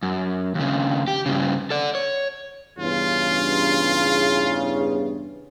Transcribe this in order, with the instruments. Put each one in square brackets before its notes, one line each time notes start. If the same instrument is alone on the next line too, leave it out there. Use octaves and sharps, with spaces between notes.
[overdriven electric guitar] F#2
D#2 C#3
G4
G2 C#3
A4 D5
C#5
[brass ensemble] E2 G2 C#3 [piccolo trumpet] F4